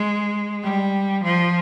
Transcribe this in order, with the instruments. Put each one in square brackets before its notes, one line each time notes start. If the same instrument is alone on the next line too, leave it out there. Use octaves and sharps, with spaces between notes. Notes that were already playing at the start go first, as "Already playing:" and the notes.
Already playing: [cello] G#3
G3
F3